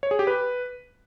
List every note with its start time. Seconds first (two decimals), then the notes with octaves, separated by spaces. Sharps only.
0.03 C#5
0.11 G#4
0.19 G4
0.27 B4